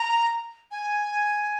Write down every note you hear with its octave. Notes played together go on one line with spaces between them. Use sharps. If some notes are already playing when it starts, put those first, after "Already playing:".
Already playing: A#5
G#5